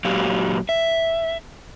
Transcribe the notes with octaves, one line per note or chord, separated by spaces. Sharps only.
A#2 F#3 G4 F5
E5